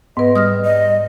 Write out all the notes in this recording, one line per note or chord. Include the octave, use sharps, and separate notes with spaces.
G#2 B3 B4 D#5
G3 D#6 F6 A#6
D#5